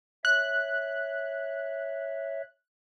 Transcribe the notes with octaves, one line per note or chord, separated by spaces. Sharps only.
C#5 E5 F#6